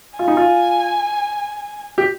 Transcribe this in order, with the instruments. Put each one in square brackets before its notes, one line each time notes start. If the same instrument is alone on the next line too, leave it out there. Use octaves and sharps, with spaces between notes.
[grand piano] F4 [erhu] G#5
[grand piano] D#4
F4
G4